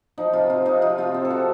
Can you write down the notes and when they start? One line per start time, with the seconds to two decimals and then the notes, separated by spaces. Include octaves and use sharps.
0.18 F3 D#4
0.33 C3 F4
0.50 C4 F4
0.66 C3 D#4
0.82 F3 F4
0.98 C3 F4
1.14 C4
1.25 A4
1.30 C3 F#4